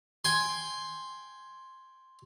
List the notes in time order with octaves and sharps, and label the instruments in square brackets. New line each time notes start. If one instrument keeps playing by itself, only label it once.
[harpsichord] G5 G#5 C6